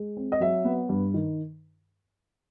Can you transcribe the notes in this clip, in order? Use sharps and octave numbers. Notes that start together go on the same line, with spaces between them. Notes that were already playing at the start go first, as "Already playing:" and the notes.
Already playing: G#3
C4
D#5
F#3 E5
B3
G2
D#3